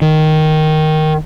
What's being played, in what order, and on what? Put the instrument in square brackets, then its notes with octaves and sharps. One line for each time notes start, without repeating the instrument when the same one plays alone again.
[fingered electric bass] D#3